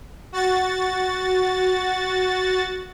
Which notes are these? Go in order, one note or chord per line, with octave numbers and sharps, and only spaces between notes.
F#4 A6